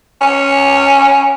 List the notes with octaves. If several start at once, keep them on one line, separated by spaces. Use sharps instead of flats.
C#4